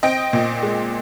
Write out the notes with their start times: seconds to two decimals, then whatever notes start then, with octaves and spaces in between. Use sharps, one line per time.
0.03 C4 D#5 G5
0.33 A#2
0.63 G#3